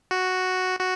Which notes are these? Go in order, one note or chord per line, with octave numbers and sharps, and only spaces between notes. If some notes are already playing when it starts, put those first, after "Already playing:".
F#4
F#4